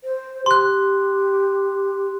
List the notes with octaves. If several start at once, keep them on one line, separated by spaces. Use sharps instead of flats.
C5
G4 C6 F#6